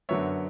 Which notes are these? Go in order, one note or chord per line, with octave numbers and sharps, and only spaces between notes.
F#2 D3 F#3 B3 C#5 E5